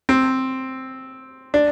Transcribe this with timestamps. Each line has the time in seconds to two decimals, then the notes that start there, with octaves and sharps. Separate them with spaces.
0.09 C4
1.54 D4